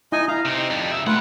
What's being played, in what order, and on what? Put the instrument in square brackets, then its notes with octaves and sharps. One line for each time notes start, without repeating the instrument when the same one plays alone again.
[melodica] D#4 D#5 G#5 [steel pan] E4
[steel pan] E4 [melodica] F5 A#5
[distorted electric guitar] C3 C4 [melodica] D#4
[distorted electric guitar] F2 G3
C#3 E5
[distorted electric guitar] A#2 F#5 [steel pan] A3 [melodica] F4 B4